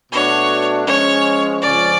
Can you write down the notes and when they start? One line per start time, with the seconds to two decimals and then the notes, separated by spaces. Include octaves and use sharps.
0.11 B2 A3 D4 F#4 C#5
0.87 F3 G#3 C#4 C#5
1.62 F2 C#3 F3 G#3 C#4 D5